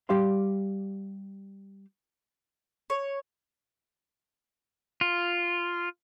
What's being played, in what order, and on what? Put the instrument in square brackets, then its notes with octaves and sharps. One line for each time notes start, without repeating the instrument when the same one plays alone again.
[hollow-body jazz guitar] G3 G4 D5 F5 C6
[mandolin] C#5
[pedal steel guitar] F4